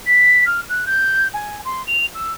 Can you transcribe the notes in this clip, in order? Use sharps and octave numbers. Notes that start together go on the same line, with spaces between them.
B6
F6
F#6
G6
G#5
C6
F7
E6